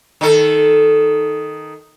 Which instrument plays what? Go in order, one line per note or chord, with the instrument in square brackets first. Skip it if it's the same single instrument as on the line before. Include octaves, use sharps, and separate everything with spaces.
[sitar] D#3 A4